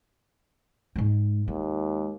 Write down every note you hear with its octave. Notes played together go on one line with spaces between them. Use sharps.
G#2 G#3
D#2 G#3